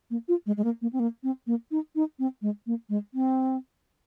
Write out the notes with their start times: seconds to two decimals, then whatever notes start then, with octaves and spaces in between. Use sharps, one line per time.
0.10 A#3
0.28 F4
0.46 G#3
0.57 G#3
0.64 A#3
0.82 A#3
0.93 C4
0.99 A#3
1.23 C4
1.47 A#3
1.71 D#4
1.95 D#4
2.19 C4
2.42 G#3
2.66 A#3
2.89 G#3
3.14 C4